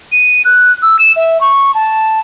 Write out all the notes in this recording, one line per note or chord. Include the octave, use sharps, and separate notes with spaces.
D#7
F#6
E6
E7
E5
C#6
A5